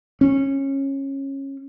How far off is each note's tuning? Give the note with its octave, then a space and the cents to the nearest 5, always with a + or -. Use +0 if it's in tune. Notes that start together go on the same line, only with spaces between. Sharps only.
C#4 -20